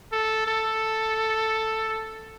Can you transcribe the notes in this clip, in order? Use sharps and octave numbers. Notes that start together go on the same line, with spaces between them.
A4
A4